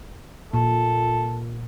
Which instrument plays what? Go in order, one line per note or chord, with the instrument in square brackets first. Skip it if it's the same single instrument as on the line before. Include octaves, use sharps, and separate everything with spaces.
[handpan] A#2 [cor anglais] A4